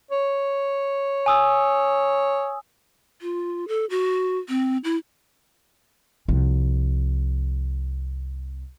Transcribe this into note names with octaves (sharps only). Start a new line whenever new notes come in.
C#5
G#5 D#6 E6
F4
A4
F#4
C4
E4
C2 F3